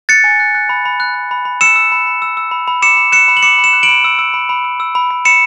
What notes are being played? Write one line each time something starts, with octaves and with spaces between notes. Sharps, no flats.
F#6 A6 C#7
G#5
F#6
F#6
B5
B5
F#6
F#6
B5
B5
E6 C#7 E7
E6
B5
B5
E6
E6
B5
B5
D6 C#7 E7
B5
F#6 C#7 E7
B5
F#7
D6 C#7 E7
B5
C#7 E7
F#6
D7 F#7
B5
E6
E6
B5
B5
E6
E6
B5
B5
B5 C#7 E7